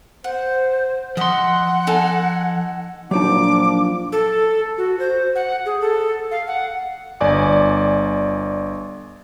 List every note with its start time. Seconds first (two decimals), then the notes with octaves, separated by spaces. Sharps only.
0.24 C5 F#5
1.17 F3 D#5 E5 F#5 C6
1.87 D#4 A4 G#5
3.11 A#2 F3 F#3 D4 D#4 A5 D6
4.12 A4
4.78 F#4
5.00 C5
5.35 F#5
5.66 G#4
5.81 A4
6.31 F5
6.47 F#5
7.21 G1 D5 G#5 D6